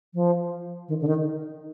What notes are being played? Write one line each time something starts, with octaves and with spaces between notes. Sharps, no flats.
F3
D#3
D3
D#3